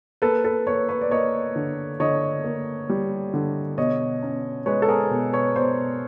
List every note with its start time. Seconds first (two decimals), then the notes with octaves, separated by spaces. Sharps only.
0.22 A#3 A4 B4
0.44 A4 B4
0.67 A#3 B4 C#5
0.89 B4 C#5
1.01 D5
1.11 A#3 C#5 D#5
1.56 D3
2.00 D3 C#5 D#5
2.44 A#3
2.89 G3
3.34 D3
3.78 B2 C#5 D#5
4.23 C#4
4.66 G#3 B4 C#5
4.82 A4
4.88 G#4 A#4
5.11 B2
5.33 B4 C#5
5.56 B2 C5 D5